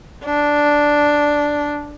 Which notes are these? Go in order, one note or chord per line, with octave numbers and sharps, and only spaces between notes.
D4